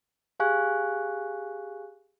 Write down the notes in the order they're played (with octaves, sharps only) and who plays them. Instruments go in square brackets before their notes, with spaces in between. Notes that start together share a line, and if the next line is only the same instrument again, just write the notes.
[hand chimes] G4 G#4 F5 G#5 C#6 F#6